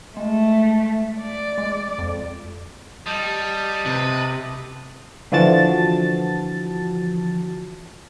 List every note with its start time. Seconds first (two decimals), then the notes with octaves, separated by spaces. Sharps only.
0.17 G#3 A3
1.21 D5
1.58 G#3
1.98 F2
3.06 G3 D#5 A5
3.86 C3 B4
5.32 D3 E3 F3 F#4 A5 A6